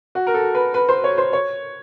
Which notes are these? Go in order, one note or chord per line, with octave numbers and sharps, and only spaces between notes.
F#4
A#4
A4
B4
B4
C5
C#5
C5
C#5